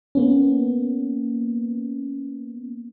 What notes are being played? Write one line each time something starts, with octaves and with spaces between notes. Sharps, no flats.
A#3 B3 C#4